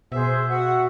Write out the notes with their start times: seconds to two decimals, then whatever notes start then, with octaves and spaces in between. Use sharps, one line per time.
0.12 B2 G#4 C5 E5
0.50 F#4 E5 F#5